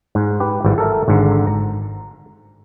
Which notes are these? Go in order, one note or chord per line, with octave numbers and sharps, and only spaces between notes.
G#2
G4 B4
G#1 E3 G3
A4 A#4 E5
G#1 G#2 D3
A#5